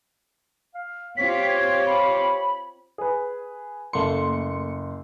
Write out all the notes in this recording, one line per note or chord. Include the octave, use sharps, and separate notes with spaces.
F5
C4 F4 G4 C#5 B6
G#6
B5
G#4 B4
F#1 A3 A#3 C6 C#7